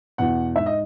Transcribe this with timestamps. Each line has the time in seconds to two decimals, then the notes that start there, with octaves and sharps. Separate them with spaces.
0.18 E2 B2 F#5
0.56 G#2 E5
0.66 D#5